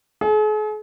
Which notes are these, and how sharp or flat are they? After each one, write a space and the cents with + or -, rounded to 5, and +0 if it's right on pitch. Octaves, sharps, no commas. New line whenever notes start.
G#4 +45